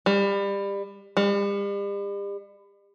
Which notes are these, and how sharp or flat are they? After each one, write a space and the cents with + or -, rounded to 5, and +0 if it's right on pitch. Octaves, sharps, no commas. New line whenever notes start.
G3 +25
G3 +40